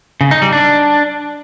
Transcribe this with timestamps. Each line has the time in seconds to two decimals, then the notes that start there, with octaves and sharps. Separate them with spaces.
0.21 C#3
0.31 D#4
0.42 G3
0.53 D4